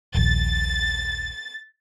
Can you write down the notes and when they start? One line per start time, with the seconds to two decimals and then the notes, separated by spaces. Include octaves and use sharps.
0.14 D#1 A#1 A6